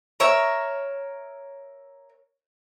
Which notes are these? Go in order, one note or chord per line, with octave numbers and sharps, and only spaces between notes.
A#4 C#5 E5